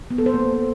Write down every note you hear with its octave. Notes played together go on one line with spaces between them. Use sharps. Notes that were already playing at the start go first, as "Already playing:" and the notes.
B3
A4
C5
A#3